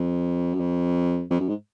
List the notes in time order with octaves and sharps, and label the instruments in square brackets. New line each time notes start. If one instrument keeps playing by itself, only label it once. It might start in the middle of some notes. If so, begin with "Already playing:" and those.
Already playing: [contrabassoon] F2
F#2
F2
F2
F#2
G#2